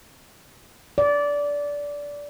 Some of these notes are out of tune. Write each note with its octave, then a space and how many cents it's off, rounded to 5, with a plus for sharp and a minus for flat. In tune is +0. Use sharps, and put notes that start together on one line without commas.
D5 -20